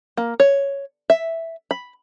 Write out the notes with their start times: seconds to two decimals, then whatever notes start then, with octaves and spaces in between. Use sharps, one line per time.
0.17 A#3
0.40 C#5
1.10 E5
1.71 B5